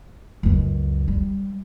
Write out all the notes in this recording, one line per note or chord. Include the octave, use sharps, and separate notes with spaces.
C#2 F#2
G3